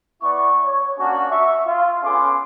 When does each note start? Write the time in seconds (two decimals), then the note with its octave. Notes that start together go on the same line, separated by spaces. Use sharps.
0.21 B3 E4 D5 C#6
0.63 C#5
0.98 A#3 C#4 D4 F#4
1.30 E5 C#6
1.66 F4
2.03 B3 C#4 G#4 A4 C6 D6